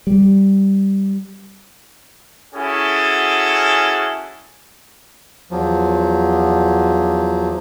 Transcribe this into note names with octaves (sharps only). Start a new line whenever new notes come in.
G3
C#4 E4 F#4 G#4 A4
E2 F3 F#3